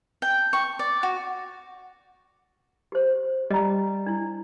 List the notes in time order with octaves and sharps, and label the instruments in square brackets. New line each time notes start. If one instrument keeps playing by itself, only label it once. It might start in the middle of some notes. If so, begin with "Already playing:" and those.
[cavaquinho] G5
C#6
D5
F#4
[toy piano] G4 C5
[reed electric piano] G3 [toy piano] D#5 A#5
[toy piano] D4 E4